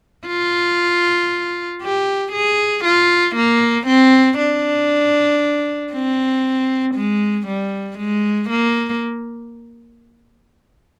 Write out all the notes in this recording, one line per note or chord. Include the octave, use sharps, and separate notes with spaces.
F4
G4
G#4
F4
A#3
C4
D4
C4
G#3
G3
G#3
A#3